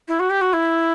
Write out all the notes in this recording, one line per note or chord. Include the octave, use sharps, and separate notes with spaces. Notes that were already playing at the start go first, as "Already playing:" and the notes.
E4
F#4
G4
F#4
E4